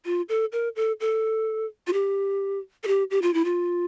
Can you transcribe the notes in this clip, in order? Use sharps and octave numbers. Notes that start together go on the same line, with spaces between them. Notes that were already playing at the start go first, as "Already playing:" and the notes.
F4
A4
A#4
A4
A4
F4
G4
A4
G4
G4
F4
E4
F4